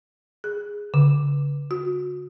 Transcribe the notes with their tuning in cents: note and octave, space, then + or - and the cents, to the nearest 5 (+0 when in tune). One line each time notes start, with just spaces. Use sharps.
G#4 -5
D3 -45
F#4 -30